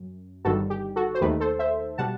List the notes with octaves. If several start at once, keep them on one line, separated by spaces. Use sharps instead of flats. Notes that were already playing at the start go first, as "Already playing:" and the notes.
Already playing: F#2
G1 G2 D#3 G3 F#4 A4
G4
F#4 A4
C5
D#2 D#3 A3 G4 B4
A4 C5
C5 E5
B2 G3 F#5 A5